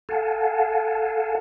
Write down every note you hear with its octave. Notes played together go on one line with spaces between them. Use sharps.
A4 F5 F#5 G#5 A5